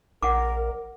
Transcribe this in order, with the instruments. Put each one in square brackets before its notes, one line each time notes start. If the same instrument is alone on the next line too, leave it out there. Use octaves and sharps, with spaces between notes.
[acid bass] A#1 [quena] A#4 [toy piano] F#5 D6